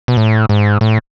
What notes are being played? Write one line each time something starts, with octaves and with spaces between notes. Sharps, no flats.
B2
A2
G#2
A2